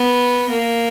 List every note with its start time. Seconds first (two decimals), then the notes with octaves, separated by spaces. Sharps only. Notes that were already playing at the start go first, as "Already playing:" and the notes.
Already playing: B3
0.50 A#3